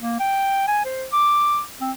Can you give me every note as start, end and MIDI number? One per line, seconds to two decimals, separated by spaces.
0.01 0.19 58
0.19 0.67 79
0.68 0.82 80
0.85 1.06 72
1.13 1.61 86
1.81 1.92 60